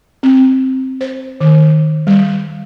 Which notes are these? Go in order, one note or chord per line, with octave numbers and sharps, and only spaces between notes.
C4
C5
D#3
G3